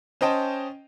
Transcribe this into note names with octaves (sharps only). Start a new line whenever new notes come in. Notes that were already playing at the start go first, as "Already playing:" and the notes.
C#4 C5 D#5 G5 A5